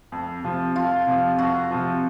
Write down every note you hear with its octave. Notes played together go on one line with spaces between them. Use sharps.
F2
C3 F3
F2 F4
C3 F3
F2 F#4
C3 F3